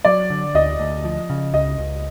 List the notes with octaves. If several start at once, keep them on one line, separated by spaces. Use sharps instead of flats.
F#3 D5
D3
D2 D#5
D2
F3
C#3
C#2 D#5
C#2